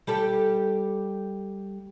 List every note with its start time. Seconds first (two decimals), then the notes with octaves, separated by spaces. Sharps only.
0.07 G3 G4 A4